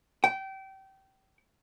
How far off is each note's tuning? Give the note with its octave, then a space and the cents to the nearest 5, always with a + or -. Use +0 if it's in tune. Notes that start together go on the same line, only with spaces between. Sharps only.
G5 -25